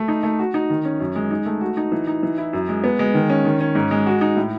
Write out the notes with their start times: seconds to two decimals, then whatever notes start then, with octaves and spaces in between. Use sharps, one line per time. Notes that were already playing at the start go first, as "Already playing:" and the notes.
Already playing: A3
0.08 D#4
0.23 A3
0.39 F#4
0.54 D#4
0.70 D#3
0.85 C#4
1.00 F#2
1.15 G#3
1.31 D#4
1.46 A3
1.61 F#4
1.77 D#4
1.92 E3
2.07 D#4
2.23 E3
2.38 E4
2.53 F#2
2.68 G#3
2.84 B3
2.99 G#3
3.14 D#3
3.30 C#4
3.45 D#3
3.61 C#4
3.75 G#2
3.91 G#3
4.06 F#4
4.21 D#4
4.36 A2